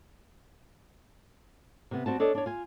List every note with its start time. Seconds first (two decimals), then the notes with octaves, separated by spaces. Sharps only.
1.91 C3 B3
2.06 G3 C4 F#4 A5
2.20 D4 A4 C#5 D#5
2.35 D4 C#5
2.46 F4 G#5